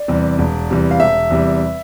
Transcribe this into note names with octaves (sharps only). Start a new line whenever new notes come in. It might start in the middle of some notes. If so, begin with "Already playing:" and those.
Already playing: D5
E2 C3 G3
E1
E2 C3 G3
F5
E1 E5
E2 C3 G3